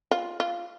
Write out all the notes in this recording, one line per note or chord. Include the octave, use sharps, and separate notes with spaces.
F4
F4